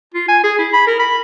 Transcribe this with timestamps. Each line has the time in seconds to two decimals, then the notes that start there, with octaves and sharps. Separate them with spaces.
0.14 F4
0.28 G#5
0.44 G#4
0.59 E4
0.73 B5
0.87 A#4
0.99 B5